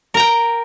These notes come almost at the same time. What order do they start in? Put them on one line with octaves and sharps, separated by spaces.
A#4 A#5 G5